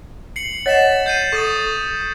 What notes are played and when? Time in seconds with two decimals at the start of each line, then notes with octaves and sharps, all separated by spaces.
0.36 C7 C#7 F#7
0.66 C#5 D#5 F#5 A6 B6 E7
1.06 G6 C7 D#7
1.32 A4 C#6 D#6 A6